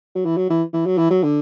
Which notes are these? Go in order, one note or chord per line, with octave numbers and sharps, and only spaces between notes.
F#3
E3
F#3
E3
E3
F#3
E3
F#3
D3